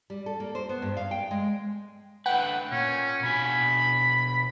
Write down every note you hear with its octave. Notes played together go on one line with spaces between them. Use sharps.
G3
A4
A#3
C5
B3
G2
F5
G5
G#3
D3 A3 B4 F#5 G5
A#2 C#4
B2 D4 G#5 B5